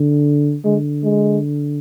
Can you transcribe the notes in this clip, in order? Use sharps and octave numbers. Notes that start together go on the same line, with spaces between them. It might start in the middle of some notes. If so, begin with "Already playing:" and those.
Already playing: D3
D3 G#3
G#3